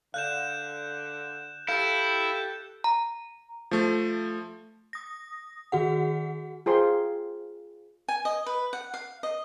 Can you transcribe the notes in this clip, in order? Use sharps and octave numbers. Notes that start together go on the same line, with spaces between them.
D3 F5 F#6 G6 E7
E4 G4 A4 F5 G6
A#5
F3 A3
D#6 A#6
D#3 F#4 G#4 F#5
F4 G#4 C5 C6
G#5
D#5
B4
F#5
F5
D#5